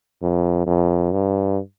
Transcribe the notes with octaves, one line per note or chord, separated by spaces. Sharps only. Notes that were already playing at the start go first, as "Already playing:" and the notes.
F2
F2
G2